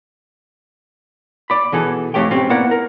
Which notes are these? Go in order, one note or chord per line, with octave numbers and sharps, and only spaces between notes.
D5 B5
B2 E3 G#4 A4
F2 D#3 A3 G4 C#5 G5
G#2 B2 C4 C#4 G4
A#3 B3 E4 A#4 D5 F#5
A#4